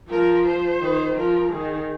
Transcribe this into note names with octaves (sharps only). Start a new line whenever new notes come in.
F3 A#4
C5
D#3
F3 A#4
D#3 G#4